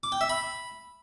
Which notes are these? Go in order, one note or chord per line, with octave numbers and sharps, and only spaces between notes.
D6
G5
E5
B5